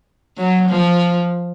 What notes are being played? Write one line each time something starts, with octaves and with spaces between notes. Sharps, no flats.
F#3
F3